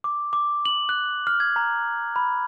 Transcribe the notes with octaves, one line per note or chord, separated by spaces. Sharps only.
D6
D6
F#7
F#6
F6
G#6
A#5
B5